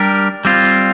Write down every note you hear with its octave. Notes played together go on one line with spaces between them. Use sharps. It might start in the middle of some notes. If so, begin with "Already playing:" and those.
Already playing: G3 D4 G4 A#4
G3 C4 F4